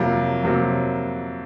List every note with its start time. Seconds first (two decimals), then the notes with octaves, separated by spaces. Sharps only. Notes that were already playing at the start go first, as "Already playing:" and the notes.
Already playing: F2 C3 F#3 A#3
0.44 F2 C3 F#3 A#3